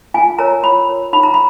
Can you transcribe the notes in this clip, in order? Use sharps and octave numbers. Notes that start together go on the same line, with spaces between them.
F4 G#5
A#4 C#5 A#5
F4 B5
A#4 C#5
D#4 B5
A#5
B5